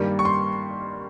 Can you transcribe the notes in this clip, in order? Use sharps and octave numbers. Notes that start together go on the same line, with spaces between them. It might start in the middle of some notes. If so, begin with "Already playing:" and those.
Already playing: G2 D#3 G3 A#3
C#6
C6